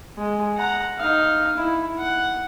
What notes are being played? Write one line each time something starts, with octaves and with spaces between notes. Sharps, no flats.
G#3
F#5 A#5
D#4 F5
E4
F#5